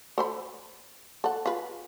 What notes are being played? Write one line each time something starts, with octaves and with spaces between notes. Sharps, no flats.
A4 C5 B5
A4 F#5
F4 G#4 B4